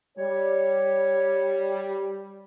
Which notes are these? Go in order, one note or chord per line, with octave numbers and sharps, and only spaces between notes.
G3 C#5